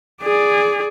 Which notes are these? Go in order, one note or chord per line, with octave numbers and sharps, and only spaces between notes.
G#4 D5